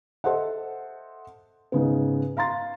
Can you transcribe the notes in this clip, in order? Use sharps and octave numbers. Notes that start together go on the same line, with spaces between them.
A4 C5 D#5 E5 F#5
G#2 C#3 B3
F5 A#5 C6 A6